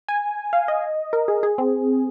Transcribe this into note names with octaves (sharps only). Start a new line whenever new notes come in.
G#5
F5
D#5
A#4
G#4
G#4
C4